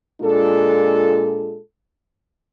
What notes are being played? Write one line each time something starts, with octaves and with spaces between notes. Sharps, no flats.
A#2 G#3 D4 F4 A4